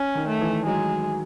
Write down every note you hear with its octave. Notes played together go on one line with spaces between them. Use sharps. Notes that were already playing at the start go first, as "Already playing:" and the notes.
Already playing: C#4
D#3
A3
E3
F#3 G#3